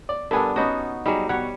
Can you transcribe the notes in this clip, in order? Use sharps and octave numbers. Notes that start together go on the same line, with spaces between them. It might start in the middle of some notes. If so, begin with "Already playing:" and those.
D5
G2 B3 D4 A4 A#4 G#5
B3 C#4 D#4 F#4
F#3 G3 D#4 G#4
B2 G3 C#5 F#5